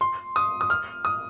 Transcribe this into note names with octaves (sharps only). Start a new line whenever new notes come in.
C6
D#6
D#6
F6
D#6